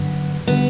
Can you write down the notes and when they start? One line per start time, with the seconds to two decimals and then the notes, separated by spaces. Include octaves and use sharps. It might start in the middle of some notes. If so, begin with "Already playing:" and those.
Already playing: G2 D3 F#3 B3
0.47 D3 G3 B3